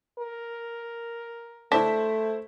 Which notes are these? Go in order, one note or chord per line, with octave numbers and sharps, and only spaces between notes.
A#4
A3 D4 E4 C5 B6